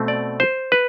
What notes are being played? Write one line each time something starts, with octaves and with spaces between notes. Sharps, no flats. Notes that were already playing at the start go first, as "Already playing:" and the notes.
Already playing: B2 A3 C4
D5
C5
B4